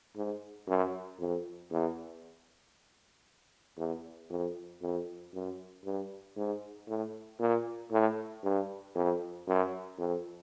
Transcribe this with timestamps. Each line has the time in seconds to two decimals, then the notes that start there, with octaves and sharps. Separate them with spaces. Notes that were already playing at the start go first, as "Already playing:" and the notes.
0.16 G#2
0.68 F#2
1.20 F2
1.71 E2
3.77 E2
4.30 F2
4.82 F2
5.34 F#2
5.85 G2
6.37 G#2
6.88 A2
7.40 A#2
7.92 A2
8.44 G2
8.95 F2
9.47 F#2
9.99 F2